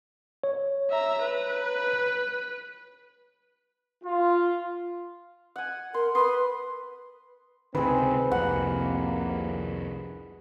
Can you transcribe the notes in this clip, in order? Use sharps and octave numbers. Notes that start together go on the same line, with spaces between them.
C#5
E5 A#5
B4
F4
F#5 G#5
A#4 C6
B4 B5 C6 D#6
C#2 C3 D#3 C4 G#4 B4
C2 F2 C3 A#3 F#5